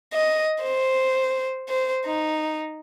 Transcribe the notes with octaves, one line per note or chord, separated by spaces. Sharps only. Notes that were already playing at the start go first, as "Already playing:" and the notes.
D#5
C5
C5
D#4